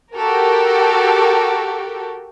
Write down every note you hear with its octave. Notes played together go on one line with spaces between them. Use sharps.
F#4 G4 A4 A#4